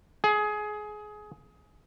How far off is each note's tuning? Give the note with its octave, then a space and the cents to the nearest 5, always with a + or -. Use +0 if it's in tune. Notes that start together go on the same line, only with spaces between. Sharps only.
G#4 +20